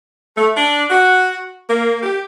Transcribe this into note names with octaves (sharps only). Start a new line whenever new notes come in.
A3
D4
F#4
A#3
G4